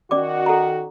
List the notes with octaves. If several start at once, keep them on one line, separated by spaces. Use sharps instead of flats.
D#3 C#4 F#4 D5 D6
A4 F#5 A#5